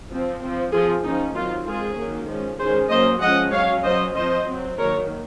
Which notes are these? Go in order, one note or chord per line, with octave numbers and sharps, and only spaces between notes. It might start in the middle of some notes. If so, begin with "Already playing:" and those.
F3 C4
F3 C4
F3 C4 F4 G#4
F3 A#3 C#4 D#4
D#3 F#3 C4 F4
D#3 G#3 C4 F4 G#4
D#3 F#3 A#3 C#4
F3 G#3 C#4
D#3 G#3 C#4 G#4 C5
F#3 A#3 C#4 C5 D#5
F3 G#3 C#4 D#5 F#5
F#3 C#4 C#5 F5
F#3 C#4 C5 D#5
F3 C4 C5 D#5
F#3 C4
D#3 F#3 A#3 A#4 C#5